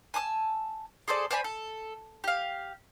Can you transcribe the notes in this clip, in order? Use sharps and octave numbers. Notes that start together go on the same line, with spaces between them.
G#5 A5 D#6 E6
G#4 A4 C5 D5
C5 D5 G#5 B5
A4
G4 F5